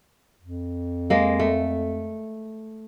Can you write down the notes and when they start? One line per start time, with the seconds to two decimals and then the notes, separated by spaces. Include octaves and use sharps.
0.42 F2
1.10 G#3 A#3
1.40 A3